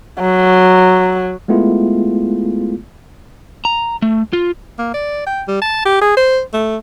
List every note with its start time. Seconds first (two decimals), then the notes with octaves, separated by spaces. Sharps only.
0.21 F#3
1.48 G#3 A3 B3 E4 F4 G#4
3.65 A#5
4.02 A3
4.33 F4
4.79 A#3
4.94 D5
5.27 G5
5.48 G3
5.62 A5
5.85 G4
6.01 G#4
6.17 C5
6.53 A3